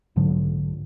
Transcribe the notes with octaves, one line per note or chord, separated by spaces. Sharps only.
B1 G#2 D3 F#3